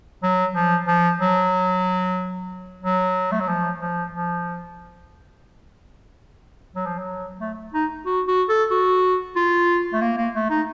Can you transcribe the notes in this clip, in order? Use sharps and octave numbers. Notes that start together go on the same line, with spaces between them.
F#3
F3
F3
F#3
F#3
A3
F#3
F3
F3
F3
F#3
F3
F#3
A3
D#4
F#4
F#4
A4
F#4
F4
A3
A#3
A#3
A3
D#4